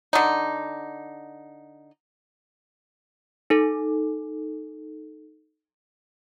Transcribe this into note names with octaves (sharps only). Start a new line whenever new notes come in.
D3 D#4
D#4 A4